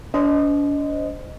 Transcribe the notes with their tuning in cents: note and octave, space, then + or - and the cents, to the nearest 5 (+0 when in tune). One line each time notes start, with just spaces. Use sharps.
D4 -45 C5 -25 D#5 +0